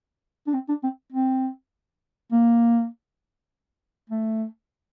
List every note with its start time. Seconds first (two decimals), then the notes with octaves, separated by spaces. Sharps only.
0.47 D4
0.53 C4
0.68 D4
0.83 C4
1.13 C4
2.32 A#3
4.10 A3